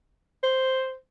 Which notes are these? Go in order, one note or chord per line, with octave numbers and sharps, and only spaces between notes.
C5